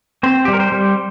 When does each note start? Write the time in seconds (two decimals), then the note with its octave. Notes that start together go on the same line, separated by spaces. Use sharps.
0.23 C4 C5
0.45 G4
0.48 G3
0.53 A#4
0.60 C5
0.72 G3